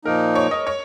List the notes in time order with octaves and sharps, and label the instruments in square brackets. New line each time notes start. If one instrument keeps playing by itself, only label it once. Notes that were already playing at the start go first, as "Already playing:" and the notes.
[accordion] A#2 F3 A#3 D#4 [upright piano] A#4
[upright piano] C#5
D#5
C#5